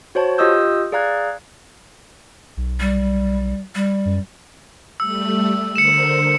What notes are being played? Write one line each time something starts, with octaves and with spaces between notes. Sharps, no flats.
F#4 C5 C#5 A5
F4 G4 D#5 D#6 E6 G6
G#4 D5 F5 A#5 F#6 G#6
B1
G3
G3
F#2
G3 A3 E6
D3 A#4 C5 C#7 E7